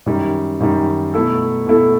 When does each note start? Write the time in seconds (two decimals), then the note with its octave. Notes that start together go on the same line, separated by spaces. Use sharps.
0.06 F#2 D#3 G3
0.60 F#2 D#3 G3
1.14 B2 A3 E4 A4
1.67 B2 A3 E4 A4